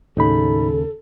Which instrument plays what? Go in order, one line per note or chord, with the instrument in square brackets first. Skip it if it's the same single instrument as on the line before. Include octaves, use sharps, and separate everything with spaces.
[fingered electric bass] D#2 C#3 [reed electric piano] A2 D#4 B5 [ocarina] A4